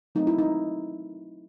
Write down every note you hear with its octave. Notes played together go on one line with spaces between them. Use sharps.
F#3 A3 C4 D#4
E4
D#4